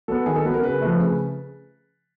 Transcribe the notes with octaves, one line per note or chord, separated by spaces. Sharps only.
F#3 B3 A4
D#3 G#4
A4
F#3 B3 B4
A#4
C#3 B4
F3 A3
C#3